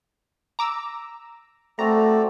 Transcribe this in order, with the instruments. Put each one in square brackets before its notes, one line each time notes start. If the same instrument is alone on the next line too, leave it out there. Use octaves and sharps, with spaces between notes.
[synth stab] A#5 D6 E6
[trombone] A3 [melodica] C4 F#4 D5 [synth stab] A#5